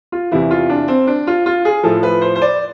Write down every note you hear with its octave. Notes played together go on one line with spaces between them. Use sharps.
F4
E2 C3 E3 E4
F4
D4
C4
D4
F4
F4
G#4
A2 F3 A4
B4
C5
C5
D5